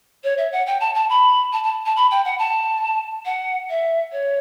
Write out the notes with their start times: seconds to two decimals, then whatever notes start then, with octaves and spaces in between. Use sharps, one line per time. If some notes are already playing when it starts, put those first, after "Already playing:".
0.23 C#5
0.37 E5
0.52 F#5
0.66 G5
0.80 A5
0.94 A5
1.09 B5
1.52 A5
1.63 A5
1.85 A5
1.96 B5
2.10 G5
2.24 F#5
2.38 A5
3.25 F#5
3.69 E5
4.12 C#5